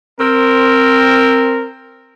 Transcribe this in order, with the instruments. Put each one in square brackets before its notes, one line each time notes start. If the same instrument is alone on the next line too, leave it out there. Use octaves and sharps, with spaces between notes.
[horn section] C4 A#4